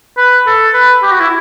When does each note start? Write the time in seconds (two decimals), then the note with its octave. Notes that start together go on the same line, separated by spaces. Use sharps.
0.18 B4
0.47 A4
0.74 B4
1.03 G4
1.11 F#4
1.20 E4